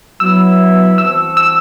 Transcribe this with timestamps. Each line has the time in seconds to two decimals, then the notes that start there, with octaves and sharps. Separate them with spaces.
0.20 F#3 B3 E4 E6
0.98 E3 G3 C4 F#4 A4 E6
1.37 E6